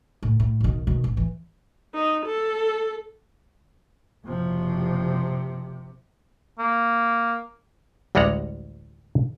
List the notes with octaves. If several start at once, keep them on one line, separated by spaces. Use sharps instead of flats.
A2 D#3
A2
B1 D#3
B2 D#3
A1
E3
D#4
A4
F#1 C3 F3
A#3
A1 D2 G3 G#3 F#5 A#5